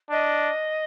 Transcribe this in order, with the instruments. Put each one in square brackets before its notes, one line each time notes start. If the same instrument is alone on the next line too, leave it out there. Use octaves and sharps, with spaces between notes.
[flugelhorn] D4 [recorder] D#5